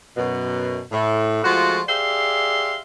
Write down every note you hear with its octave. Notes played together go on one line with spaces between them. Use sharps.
F#2 B2
A2
F3 G#3 A3 F4 F#4
G4 G#4 D5 E5 F5 C6